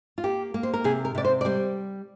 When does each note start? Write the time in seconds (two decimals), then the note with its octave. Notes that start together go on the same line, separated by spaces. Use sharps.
0.18 F4
0.24 A#3 G4
0.54 A#3
0.63 C5
0.74 A#4
0.84 C3 G#4
1.05 A#4
1.15 C3 D5
1.24 C5
1.41 D5
1.45 G3 C5